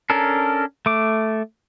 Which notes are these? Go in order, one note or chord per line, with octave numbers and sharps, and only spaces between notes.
C#4 D4 A4 A#4
A3 D6